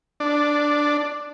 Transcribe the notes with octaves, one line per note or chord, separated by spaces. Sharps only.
D4